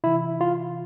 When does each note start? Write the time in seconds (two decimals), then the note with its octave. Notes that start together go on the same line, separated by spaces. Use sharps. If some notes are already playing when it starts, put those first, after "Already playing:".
0.04 C3 E3 E4
0.41 F4